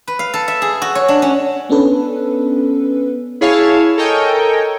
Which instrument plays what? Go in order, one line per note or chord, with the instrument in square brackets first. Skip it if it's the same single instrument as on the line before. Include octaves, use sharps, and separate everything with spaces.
[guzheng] B4
F5
A4
E5
G#4
F#4
C#5
D4
C#4
[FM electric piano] B3 C#4 D4 A4 B4
[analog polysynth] E4 G#4 C#5 F5 G#5 A5
A4 A#4 C#5 D#5 G5 G#5